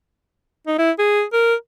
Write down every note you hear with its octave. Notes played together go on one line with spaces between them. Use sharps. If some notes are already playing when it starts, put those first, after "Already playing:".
D#4
E4
G#4
A#4